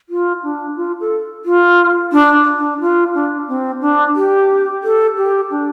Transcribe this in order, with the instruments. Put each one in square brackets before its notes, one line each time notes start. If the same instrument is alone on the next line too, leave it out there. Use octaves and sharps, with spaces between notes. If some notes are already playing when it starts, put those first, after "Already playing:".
[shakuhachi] F4
D4
F4
A4
F4
D4
D4
F4
D4
C4
D4
G4
A4
G4
D4